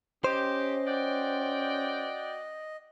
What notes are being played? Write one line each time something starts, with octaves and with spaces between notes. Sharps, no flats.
C#4 G4 C5 D#5
F#4 D5 G5